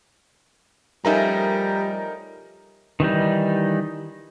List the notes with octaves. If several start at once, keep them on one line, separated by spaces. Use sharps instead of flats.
F3 G3 A3 C#4 D#4 A#4 A#5
D#3 E3 G3 D#4